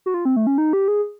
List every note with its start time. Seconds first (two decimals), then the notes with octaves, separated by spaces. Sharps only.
0.06 F#4
0.14 F4
0.25 C4
0.36 A3
0.47 C#4
0.58 D#4
0.73 G4
0.88 G#4